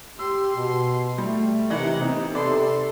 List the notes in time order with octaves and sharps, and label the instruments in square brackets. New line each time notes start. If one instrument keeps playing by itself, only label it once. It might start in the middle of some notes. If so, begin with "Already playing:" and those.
[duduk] G4 [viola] C6 [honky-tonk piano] E6
[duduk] B2
[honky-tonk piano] G3 [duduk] A3
[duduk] C3 [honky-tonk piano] E3 D#4 [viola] A#4 F#5
[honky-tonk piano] C3 [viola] B3 [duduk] D#4
[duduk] C3 [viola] A4 C6 [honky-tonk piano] B4 D5